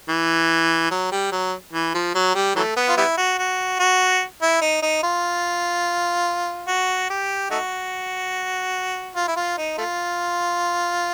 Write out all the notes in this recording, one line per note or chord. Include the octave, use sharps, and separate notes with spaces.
E3
F#3
G3
F#3
E3
F3
F#3
G3
E3 F#3 A3
B3
F4
G3 B3 E4
F#4
F#4
F#4
E4
D#4
D#4
F4
F#4
G4
A3 D#4 F#4
F4
E4
F4
D#4
A3 F4